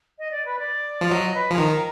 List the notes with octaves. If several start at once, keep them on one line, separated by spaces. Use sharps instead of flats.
D#5
D5
B4
D5
F3
F#3 D#5
B4
F3
G#4
D#3 A#4
A#4